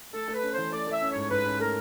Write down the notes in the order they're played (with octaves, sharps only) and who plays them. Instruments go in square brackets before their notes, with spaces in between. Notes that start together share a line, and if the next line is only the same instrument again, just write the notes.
[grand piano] A3 [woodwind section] A4
[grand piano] A3
[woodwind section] B4
[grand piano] C#4
[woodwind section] C5
[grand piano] E3
[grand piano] A3 [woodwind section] D5
[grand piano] A3 [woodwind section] E5
[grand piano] C#4
[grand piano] G#2 [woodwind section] C#5
[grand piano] G#2 [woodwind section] B4
[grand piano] C#4
[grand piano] A3 [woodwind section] A#4